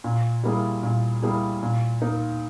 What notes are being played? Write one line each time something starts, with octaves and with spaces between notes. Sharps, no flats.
A#2
G3 A#3 E4 G#4
A#2
G3 A#3 E4 G#4
A#2
A#3 D#4